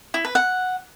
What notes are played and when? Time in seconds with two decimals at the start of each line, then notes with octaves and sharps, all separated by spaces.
0.14 E4
0.25 B4
0.35 F#5